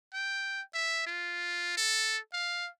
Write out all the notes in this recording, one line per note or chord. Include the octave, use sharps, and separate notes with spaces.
G5
E5
F4
A4
F5